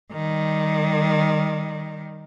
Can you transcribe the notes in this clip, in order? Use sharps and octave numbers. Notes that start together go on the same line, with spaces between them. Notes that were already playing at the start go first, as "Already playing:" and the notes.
D#3 G3